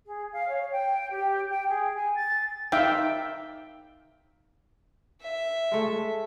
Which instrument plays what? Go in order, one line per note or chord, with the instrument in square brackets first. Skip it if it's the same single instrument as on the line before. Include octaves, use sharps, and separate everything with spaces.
[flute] G#4
F5
C#5
G5
G4
G5
G#4
G#5
A6
[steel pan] D#4 E5 F5 G5
[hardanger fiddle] E5
[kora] G#3 A3